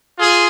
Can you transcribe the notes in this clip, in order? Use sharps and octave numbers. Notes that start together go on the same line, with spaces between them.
F4 G#4